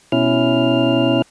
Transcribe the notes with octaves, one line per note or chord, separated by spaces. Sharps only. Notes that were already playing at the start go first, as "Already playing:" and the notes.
B2 C#4 E4 F6